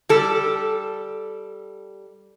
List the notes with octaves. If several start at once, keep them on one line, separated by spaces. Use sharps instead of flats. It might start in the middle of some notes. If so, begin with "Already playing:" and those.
G3 A4